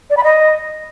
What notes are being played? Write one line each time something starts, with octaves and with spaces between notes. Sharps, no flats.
D5
B5
D#5